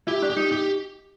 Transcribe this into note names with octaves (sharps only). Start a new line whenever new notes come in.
E4 G4
D4
G4
D#4
G4